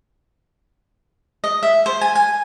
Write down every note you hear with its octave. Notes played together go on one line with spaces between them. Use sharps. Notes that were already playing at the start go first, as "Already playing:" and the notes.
D#5
E5
C5
G#5
G#5